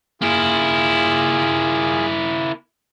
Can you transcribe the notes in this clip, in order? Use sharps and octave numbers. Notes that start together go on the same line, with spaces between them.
A#3 E4 F4 G#4